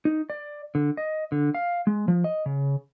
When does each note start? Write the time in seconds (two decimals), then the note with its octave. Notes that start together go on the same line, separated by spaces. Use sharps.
0.05 D#4
0.30 D5
0.75 D3
0.97 D#5
1.32 D3
1.55 F5
1.87 G#3
2.08 F3
2.24 D#5
2.46 C#3